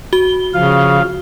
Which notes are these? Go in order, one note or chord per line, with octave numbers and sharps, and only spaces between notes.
F#4 G7
C#3 F3 F5